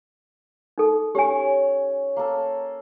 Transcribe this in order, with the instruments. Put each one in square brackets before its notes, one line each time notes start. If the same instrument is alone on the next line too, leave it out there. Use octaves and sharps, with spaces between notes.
[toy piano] D#4 A4
[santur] C#4 C#5 [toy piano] G4 G#5
[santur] A#3 A4